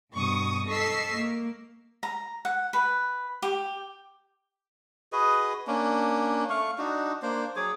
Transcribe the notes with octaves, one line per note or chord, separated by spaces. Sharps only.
G2 B2 C#6 D#6
A4 D#5 C#6 E6 B6 C7
A#3
A#5
F#5
B4
G4
F#4 G#4 B4 D#5
A#3 C#4 D4
A3 F5 C#6
D4 D#4 F#4
A#3 D4 C5
F#3 G#4 C#5 D6